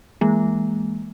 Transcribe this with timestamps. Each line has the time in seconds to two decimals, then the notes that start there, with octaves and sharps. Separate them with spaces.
0.21 E3 G#3 A#3